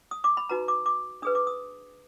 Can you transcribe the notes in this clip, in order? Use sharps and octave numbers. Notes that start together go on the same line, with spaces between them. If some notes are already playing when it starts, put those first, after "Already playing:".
D#6
D6
B5
D#4 F#4 B4 A#5
D6
D6
D4 G#4 B4 D#6
D6
D#6